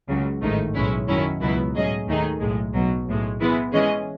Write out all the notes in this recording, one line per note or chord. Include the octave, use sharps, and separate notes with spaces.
C#2 C#3 F#3
A1 G#2 D#3 A3 D#4
B1 A2 G#3 C#4 E4
F#2 D#3 F#3 C#4 E4
C#2 B2 F#3 B3 E4
A2 F#3 C#4 G#4 D#5
D#2 D#3 A3 D#4 G#4
B1 A2 G#3
B1 B2 F#3
B1 A2 G#3
E3 G#3 B3 E4
E3 G#3 C#4 G#4 D#5